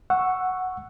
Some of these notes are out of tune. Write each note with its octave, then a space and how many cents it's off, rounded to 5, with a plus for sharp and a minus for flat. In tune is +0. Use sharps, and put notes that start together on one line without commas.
F#5 +0 C#6 +0 E6 +10